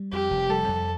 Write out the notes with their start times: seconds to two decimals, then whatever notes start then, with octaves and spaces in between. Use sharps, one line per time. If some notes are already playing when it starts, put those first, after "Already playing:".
Already playing: G3
0.12 F2 G4
0.31 F1
0.50 G3 A4
0.69 F2